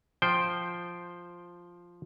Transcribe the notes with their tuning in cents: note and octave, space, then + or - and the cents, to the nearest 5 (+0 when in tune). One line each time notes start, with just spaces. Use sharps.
F3 +0 C5 +0 G5 +0